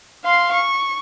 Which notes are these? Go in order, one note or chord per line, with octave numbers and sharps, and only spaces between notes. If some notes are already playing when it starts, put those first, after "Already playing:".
F5 C6
C#6